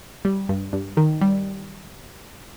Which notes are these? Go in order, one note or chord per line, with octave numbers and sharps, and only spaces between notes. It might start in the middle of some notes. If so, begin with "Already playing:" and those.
G3
G2
G2
D#3
G3